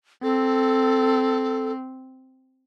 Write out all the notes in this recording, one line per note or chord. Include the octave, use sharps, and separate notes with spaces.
C4 A4